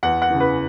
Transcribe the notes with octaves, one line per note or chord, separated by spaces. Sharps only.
E2 F#5
F#5
C#3 E3
B4